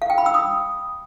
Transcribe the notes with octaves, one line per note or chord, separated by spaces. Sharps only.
F5
G5
B5
E6
D#6